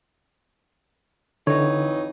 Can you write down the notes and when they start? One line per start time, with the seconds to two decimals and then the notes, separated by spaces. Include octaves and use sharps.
1.47 F2 D3 E3 D#4 C#5